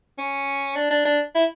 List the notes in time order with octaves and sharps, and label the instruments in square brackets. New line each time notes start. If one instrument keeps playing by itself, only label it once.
[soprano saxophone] C#4
D4
D4
D4
E4